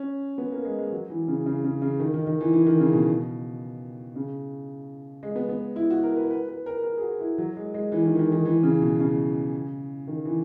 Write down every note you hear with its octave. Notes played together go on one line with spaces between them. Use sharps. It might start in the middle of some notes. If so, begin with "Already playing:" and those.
Already playing: C#4
B3
A#3
G#3
G#3
F#3
E3
C#3
C#3
C#3
C#3
D#3
D#3
D#3
E3
E3
D#3
C#3
B2
C#3
G#3
B3
B3
E4
F#4
A#4
B4
B4
B4
A#4
A#4
G#4
F#4
E4
F#3
G#3
G#3
E3
D#3
E3
D#3
D#3
E3
C#3
B2
C#3
D#3
E3